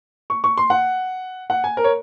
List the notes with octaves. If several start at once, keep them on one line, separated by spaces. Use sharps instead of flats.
C#6
C#6
C6
F#5
F#5
G#5
A#4
C#5